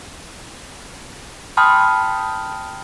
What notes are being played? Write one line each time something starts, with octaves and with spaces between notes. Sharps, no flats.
G5 A5 B5 C6 D#6 F6